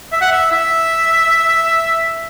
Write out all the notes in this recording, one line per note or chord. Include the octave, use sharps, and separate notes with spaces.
E5
F#5
E5
E5